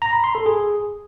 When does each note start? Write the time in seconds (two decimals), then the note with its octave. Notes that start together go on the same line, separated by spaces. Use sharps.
0.02 A#5
0.13 B5
0.24 C6
0.35 A4
0.46 G#4